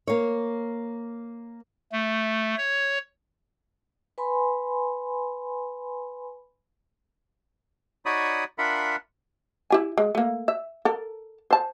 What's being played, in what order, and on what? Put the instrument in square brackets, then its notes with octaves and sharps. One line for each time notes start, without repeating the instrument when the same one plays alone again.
[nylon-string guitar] A#3 C#5
[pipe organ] A3
C#5
[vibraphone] B4 G#5 B5 C6
[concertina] D#4 F#4 C#5 D5 B5 D#6
D4 F4 A#4 E5 F#5 B5
[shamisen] E4 G4 G#5
G#3
A3 A#3
E5
A4 A#4
C5 A5